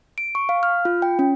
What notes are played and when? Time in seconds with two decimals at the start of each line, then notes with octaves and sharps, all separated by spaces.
0.18 D7
0.35 C#6
0.49 F5
0.63 F6
0.85 F4
1.02 G5
1.19 C#4